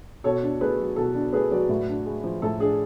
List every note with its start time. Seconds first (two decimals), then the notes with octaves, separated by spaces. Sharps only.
0.24 B2 A4 C#5
0.42 D4
0.61 A3 G#4 B4
0.79 F#3
0.96 B2 A4
1.14 D4
1.33 A3 G#4 B4
1.51 F#3 B4 D5
1.69 A2
1.88 D4
2.05 G#3
2.24 F3
2.42 A2 A4
2.60 D4 G#4